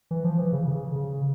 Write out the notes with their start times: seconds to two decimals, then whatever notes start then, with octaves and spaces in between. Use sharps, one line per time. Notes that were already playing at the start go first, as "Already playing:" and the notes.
0.11 E3
0.25 F3
0.39 E3
0.53 C#3
0.68 C#3
0.96 C#3